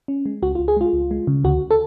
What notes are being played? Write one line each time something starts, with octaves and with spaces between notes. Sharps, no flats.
C#4
G#3
C#2 F#4
C#2 F4
G#4
G#3 F4
C#2
G#3
C#3
D2 F#4
A4